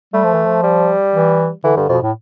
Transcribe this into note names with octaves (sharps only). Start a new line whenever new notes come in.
G3 A3
F3
E3
F3
G3
E3
D3 E3
G2 D3
F2 B2
A2